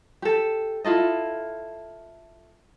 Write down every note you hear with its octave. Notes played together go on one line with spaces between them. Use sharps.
G4 A4
E4 F4 A4 D#5